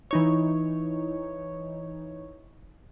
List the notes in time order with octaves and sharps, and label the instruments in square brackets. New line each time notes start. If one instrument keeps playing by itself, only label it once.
[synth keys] E3 D#4 C#5